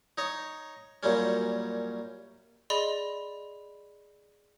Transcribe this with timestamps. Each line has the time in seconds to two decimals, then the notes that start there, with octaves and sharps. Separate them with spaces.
0.18 D#4 C#5
1.03 F#2 A#2 G3 C#4
2.70 G#4 D5 D#5 B5 C6